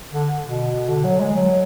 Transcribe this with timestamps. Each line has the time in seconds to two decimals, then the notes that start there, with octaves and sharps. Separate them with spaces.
0.12 D3
0.43 B2
0.89 D3
1.04 F#3
1.20 G#3
1.36 F#3